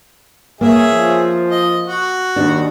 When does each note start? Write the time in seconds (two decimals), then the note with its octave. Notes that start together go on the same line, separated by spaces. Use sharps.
0.61 A#3 C#4 G#4 E5
0.93 F3
1.49 D#5
1.87 F#4
2.36 D#2 D4